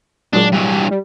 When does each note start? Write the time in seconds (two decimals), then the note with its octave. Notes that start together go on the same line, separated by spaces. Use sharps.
0.33 A#2 F#3 G#3 D4
0.53 G2 E3
0.91 G3